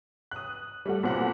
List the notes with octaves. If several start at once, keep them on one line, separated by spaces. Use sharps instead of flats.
D#6 F#6
G3 A3 F#5
B1 A#2 C4 F#5